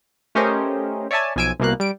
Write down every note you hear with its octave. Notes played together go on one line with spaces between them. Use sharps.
A3 C#4 G4 A#4 C5 D#5
C#5 D5 E5 G#5 A5
B1 F3 G#5 E6 D7
C2 B2 A#3 F5 F#6
G3 D7